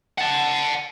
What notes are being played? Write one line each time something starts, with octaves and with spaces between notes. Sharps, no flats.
F#5 A5